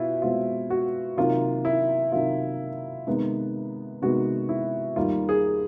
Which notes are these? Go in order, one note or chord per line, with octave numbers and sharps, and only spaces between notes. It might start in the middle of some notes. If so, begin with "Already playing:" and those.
Already playing: B2 E4 F4
B2 G#3 C4 F4
F#4
C3 D#3 F#3 A#3 F4
E4
C3 D#3 F#3 A#3 F4
C3 D#3 G#3 B3
C3 D#3 G#3 B3 F#4
E4
D#2 D#3 G3 A#3 F4
G#4